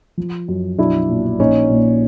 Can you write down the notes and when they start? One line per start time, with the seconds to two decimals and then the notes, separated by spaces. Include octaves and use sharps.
0.17 F3
0.48 F#2
0.78 B1 D4 E4
1.09 A#2
1.39 A#1 C#4 D#4
1.70 A#2